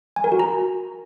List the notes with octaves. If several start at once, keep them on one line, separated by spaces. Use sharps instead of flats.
G#5
A#4
F#4
A#5